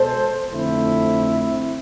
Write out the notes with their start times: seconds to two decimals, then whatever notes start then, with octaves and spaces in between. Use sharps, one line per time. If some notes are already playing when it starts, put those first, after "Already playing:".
Already playing: B2 G#3 A4 C5
0.52 F2 D3 A3 C4 E4